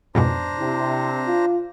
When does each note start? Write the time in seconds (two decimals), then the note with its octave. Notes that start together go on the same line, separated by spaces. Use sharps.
0.15 F2 G#2 B2 D4 C5 A#5
0.59 C3 E4
1.27 F4